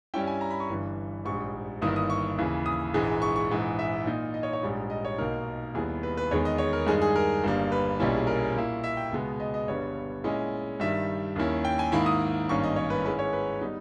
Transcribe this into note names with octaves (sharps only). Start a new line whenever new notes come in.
G2 G3 C#4 E4 G5
G#5
A#5
B5
C#6
G1 G2 E3
A#1 G#2 G3 C#6
G1 G2 D#3 A#3 E4 D#6
D#6
C#6
D#2 C#3 E3
D#6
A#1 G#2 E3 G#3
C#6
C#6
A#1 G#2 E3
E5
A#2 A#3 D#4
D#5
C#5
C#5
A#1 G#2 G3
D#5
C#5
B1 B2 A#3 D#4 A#4
D#2 D#3 G3 B3 E4 G#4
B4
B4
E2 D#3 G#3 B3 C#5
D#5
C#5
A#4
G2 D#3 G#3 D#4 G#4
G#4
A#4
G1 G2 G3 A#3
B4
B1 A#2 G3 C#4 E4
G#4
A#4
A#2 A#3 E4
E5
G5
C#2 B2 G#3 B3
D#5
D#5
G1 G2 G3 B3 C#5
A#2 G#3 C#4 E4 D#5
G2 D#3 G3 E5
D#2 D#3 A#3 C#4 E4
G5
G#5
G#2 D#3 A#3 E4 B5
D#6
G#1 G2 D#3 A#3 C#4 C#6
D#5
C#5
B4
G#2 D#3 G#3 C#4 E4 B4
C#5
B4
G3 B3 D#4